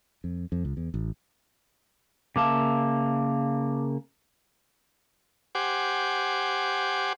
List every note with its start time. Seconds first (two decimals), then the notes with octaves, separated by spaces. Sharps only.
0.24 F2
0.52 F2
0.65 C#2
0.77 E2
0.94 A1
2.36 C#3 A#3 E5 F5 A5 D6
5.55 G4 C5 F#5 G#5 D6